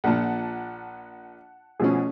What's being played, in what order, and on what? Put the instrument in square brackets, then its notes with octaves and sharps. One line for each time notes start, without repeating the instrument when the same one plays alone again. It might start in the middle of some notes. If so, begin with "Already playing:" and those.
[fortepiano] A#1 A#2 [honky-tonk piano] F#5 A5
[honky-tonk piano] B2 F3 G#4 [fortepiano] A3 C#4